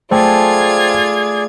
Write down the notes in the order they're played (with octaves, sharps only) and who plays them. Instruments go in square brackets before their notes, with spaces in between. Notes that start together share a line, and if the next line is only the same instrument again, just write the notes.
[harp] A3 [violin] F4 G#6 [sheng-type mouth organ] G#4 D5 [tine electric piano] C5 G5 G#5